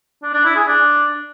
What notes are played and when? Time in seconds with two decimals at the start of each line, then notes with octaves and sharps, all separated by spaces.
0.22 D4
0.34 D4
0.45 E4
0.56 G#4
0.67 D4